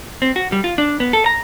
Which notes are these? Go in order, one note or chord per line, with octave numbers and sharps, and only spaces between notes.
C4
F#4
G3
F4
D4
B3
A4
A#5